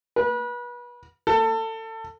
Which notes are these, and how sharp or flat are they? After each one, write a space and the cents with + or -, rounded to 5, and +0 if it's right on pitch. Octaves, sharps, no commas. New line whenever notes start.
B4 -30
A4 +25